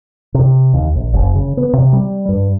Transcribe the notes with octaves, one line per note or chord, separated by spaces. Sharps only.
C3
D#2
A#1
F#1
C#3
B3
C3
G3
G2